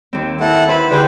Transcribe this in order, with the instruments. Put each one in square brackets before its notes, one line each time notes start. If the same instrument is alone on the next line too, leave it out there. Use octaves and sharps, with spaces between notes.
[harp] D#2 C4
[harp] C4 [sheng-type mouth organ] E4 A4 F#5
[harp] E4 B4 C5 [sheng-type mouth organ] B5
[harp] D3 G#4 G5 [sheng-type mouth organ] G4 B4 C5